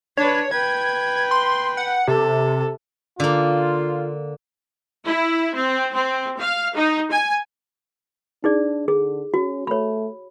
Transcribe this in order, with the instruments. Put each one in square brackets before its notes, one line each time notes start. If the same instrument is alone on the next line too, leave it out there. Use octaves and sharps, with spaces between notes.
[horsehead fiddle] D4 B4 [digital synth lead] C#5
[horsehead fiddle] B4 G5 [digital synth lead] G#6
[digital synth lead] C6
F#5
[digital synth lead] C3 [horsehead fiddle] A4
[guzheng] D3 A#3 [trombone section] F4
[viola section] E4
C4
C4
F5
D#4
G#5
[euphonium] D4 [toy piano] D#4 G#4 D5
[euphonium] D3 [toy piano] G#4
[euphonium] C#4 [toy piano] F#4
[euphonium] A3 [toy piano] C#5 B5